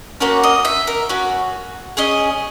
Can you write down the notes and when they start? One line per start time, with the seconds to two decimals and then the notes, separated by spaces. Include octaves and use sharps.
0.20 A#3 C#4 F#4 C#5
0.43 D#5
0.65 E5
0.87 A#4
1.09 C#4 F#4
1.97 C#4 G#4 D#5